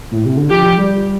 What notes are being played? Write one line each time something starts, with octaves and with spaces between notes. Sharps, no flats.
A2
C3
D3
F3 G4
G3